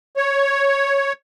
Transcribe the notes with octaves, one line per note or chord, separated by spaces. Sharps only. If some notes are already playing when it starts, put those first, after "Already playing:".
C#5